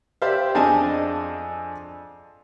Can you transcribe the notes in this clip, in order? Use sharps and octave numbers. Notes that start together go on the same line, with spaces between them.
G4 C5 D5 E5 F5
F2 D4 G#4 D#5 G#5 A5